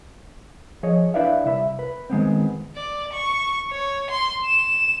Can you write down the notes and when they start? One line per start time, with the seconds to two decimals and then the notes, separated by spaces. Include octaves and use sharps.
0.83 F3 G#4 C#5 D#5
1.14 D4 E4 B4 D5 E5 F5
1.44 C2 C3 E5 B5
1.79 B4
2.10 D#3 G#3 B3 C4
2.76 D5
3.13 C#6
3.71 C#5
4.10 C6
4.45 E7